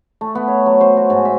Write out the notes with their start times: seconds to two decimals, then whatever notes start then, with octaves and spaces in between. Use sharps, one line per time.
0.21 A3
0.35 B3
0.48 C#5
0.66 F#3
0.81 C5
0.97 F#4
1.10 G#2
1.25 E5